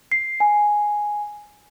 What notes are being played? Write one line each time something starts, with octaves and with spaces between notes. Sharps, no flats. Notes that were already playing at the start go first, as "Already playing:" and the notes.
C7
G#5